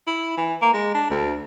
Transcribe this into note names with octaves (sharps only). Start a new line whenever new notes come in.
E4
E3
A#3
G#3
D4
D2